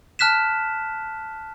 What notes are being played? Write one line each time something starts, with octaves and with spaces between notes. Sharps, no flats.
A5 F6 F#6 B6 E7